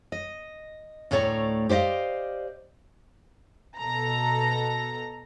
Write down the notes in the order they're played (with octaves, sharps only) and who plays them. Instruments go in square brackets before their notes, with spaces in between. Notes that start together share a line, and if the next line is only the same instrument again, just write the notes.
[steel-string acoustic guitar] D#5
D2 A2 A3 C#5 D5 A#5
G4 C5 D5 D#5 F5
[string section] B2 A4 A#5